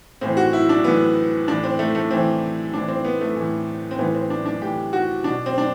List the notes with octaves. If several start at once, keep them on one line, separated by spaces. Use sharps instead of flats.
A2 E3 C4
F#4
E4
D4
A2 E3 B3
A2 E3 D4
C4
A3
A3
A2 E3 C4
A2 E3 D4
C4
B3
A3
A2 E3
C4
A2 E3 B3
C4
D4
D4
A2 E3 G4
F#4
B2 D4
C4
D4